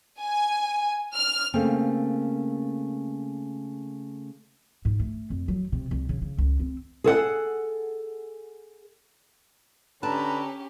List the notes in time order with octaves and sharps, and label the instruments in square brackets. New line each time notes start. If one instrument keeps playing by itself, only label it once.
[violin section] G#5
F6
[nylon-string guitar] C#3 A3 A#3 C4
[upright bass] G#2
A3
F2
F#3
C3
C2
C#3
C#3
C#2
C4
[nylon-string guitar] G#4 A4 F#5
[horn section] D3 B4 A#5 [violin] C#4 G4 [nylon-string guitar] A5